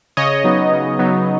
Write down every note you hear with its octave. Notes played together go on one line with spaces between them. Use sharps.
C#3 C#5 D#5
F#3 B3 D#4
C#3
F#3 B3 D#4